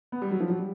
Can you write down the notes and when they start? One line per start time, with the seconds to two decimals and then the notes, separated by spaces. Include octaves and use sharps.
0.12 B3
0.22 G3
0.31 F#3
0.41 F3
0.50 F#3
0.59 G3